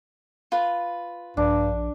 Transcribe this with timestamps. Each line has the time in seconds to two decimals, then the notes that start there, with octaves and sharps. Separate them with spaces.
0.52 F4 B4
1.37 A#1 G2 D4